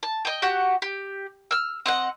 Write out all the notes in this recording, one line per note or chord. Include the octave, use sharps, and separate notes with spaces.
A5
D#5 G5
F#4 G4 F#5
G4
E6 F6
C4 D#5 F#5